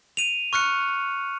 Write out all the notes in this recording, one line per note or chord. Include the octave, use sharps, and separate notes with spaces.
D#7 F7
C#6 F6 F#6 C#7